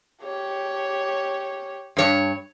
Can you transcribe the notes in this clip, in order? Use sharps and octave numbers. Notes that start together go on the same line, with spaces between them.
G4 C#5
G2 C#5